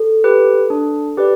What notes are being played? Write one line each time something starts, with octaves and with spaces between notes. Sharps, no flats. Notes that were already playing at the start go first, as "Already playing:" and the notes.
Already playing: A4
G4 B4
D4
G4 B4 D5